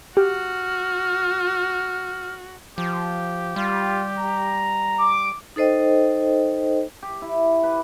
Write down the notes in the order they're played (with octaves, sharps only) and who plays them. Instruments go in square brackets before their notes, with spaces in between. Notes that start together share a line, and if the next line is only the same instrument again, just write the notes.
[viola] F#4 [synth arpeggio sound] G4 [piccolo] F6
[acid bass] F3 [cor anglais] G4
[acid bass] G3 [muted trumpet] F4
[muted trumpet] A#5
[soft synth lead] D6
[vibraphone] D#4 A4 C5 D#5 G5
[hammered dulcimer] G4
E4
B4